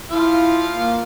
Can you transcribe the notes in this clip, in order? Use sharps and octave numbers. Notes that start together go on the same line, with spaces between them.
F3 E4 F4 F5
A#3